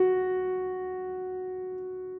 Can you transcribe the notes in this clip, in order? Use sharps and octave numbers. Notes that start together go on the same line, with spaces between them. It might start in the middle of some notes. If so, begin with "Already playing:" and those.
Already playing: F#4